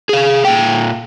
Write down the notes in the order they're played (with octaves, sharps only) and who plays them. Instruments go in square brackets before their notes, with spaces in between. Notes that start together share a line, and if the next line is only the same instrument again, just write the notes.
[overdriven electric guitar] G#4 F5
A#2 G5